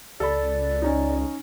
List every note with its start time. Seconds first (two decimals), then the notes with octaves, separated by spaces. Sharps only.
0.20 C#2 A4 D5 B5
0.82 C#4 D#4